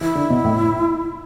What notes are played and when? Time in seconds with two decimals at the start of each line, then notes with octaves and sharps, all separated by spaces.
0.01 E3 E4
0.15 D3
0.30 B2
0.44 A2